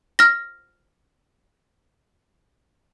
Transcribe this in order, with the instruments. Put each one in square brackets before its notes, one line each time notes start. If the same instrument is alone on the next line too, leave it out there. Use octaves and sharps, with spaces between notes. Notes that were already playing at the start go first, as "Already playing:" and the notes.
[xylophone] F6 A#6